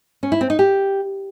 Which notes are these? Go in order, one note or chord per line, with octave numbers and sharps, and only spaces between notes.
C#4
E4
C4
D#4
G4